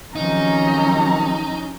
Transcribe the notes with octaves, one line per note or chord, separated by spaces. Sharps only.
C3 D#3 F3 F#3 C#4 D#4 A#5